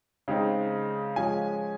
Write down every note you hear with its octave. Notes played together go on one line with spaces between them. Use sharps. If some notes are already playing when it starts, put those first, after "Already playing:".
C#3 G#3 C4 D#4
F3 G#3 C#4 G#5